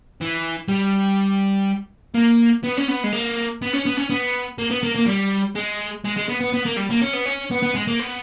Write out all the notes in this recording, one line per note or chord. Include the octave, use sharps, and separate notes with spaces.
E3
G3
A#3
B3
C#4
B3
G#3
A#3
B3
C#4
B3
C#4
B3
A#3
B3
A#3
A#3
G3
G#3
G#3
G#3
B3
B3
B3
A#3
G3
A#3
C#4
B3
C#4
B3
B3
G#3
A#3
B3